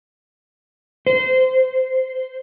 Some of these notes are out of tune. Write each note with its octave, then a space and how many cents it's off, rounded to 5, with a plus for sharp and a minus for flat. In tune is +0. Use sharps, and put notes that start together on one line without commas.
C5 -15